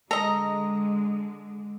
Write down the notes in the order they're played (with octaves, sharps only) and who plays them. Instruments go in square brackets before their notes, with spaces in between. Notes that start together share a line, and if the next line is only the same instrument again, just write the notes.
[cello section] D3 G#3 [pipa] A4 D#5 [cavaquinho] A#5